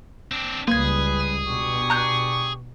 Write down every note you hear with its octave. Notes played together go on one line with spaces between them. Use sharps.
C4 D4
C#2 C#3 G3 A#3 G#4 B4 D#6 G#6
B2 D4 G4 C#6
A#5 F#6 G6